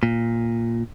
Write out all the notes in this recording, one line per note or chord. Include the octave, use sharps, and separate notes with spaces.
A#2